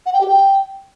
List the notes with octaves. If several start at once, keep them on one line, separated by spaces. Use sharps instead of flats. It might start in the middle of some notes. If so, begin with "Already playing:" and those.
F#5
G5
G4
G5